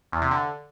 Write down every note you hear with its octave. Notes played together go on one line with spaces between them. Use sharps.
E2
C3
D3